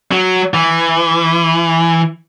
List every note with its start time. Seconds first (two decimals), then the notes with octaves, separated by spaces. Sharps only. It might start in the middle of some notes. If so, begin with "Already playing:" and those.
0.11 F#3
0.54 E3